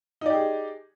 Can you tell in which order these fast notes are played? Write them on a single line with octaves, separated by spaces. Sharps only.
D#4 D5 G4 G#4